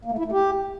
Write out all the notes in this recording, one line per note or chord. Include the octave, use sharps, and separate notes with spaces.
A#3
A3
E4
A3
G4